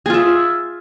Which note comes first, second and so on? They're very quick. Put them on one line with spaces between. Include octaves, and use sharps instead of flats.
G#4 F4 E5